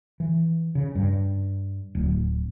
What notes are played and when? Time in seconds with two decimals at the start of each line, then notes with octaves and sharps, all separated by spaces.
0.20 E3
0.75 C#3
0.95 G2
1.95 D1